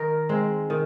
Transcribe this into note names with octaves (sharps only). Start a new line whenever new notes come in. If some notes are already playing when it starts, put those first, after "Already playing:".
Already playing: D#3 A#4
G#3 C4
D#3